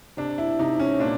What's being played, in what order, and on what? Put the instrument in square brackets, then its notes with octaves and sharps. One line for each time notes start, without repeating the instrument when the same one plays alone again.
[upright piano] C3 D4
E4
C3 D#4
C#4
A#2 D4